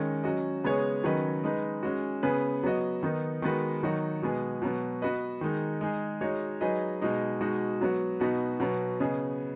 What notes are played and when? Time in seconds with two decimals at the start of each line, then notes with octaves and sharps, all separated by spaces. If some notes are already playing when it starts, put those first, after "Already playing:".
Already playing: D#3 G#3 C#4
0.23 F#3 C#4 F#4 D#5
0.64 C#3 G#3 B3 G#4 C#5
1.04 D#3 F#3 C#4 B4 D#5
1.44 G#3 D#4 B4
1.83 G#3 C#4 F#4
2.23 C#3 B3 G#4 B4
2.63 F#3 B3 F#4 D#5
3.03 D#3 B3 D#4
3.42 D#3 G#3 B3 F#4 B4
3.83 D#3 F#3 D#4 F#4
4.22 B2 G#3 B3 G#4
4.62 B2 F#3 B3
5.02 B3 F#4 B4 D#5
5.41 D#3 G#3 D#4
5.81 G#3 D#4 G#4
6.21 G#3 D#4 F#4 C#5
6.61 F#3 D#4 G#4 B4 D#5
7.02 B2 G#3 D#4
7.40 B2 G#3 D#4 F#4
7.81 F#3 B3 F#4
8.20 B2 B3 D#4 F#4 B4
8.60 B2 F#3 B3
9.00 C#3 B3 G#4 D#5